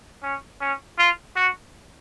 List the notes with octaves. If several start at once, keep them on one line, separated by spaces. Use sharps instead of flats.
C#4
C#4
F4
F#4